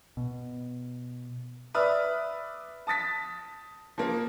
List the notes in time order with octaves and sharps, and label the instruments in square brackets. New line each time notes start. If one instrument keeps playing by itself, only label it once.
[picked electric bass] B2
[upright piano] B4 D5 E5 B5 D#6 F6
A5 D#6 A6 B6
F3 A#3